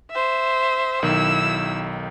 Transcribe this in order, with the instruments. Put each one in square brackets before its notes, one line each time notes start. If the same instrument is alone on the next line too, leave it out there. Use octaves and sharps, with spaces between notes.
[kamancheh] C5 E5
[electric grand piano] B1 D#3 [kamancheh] E4 E6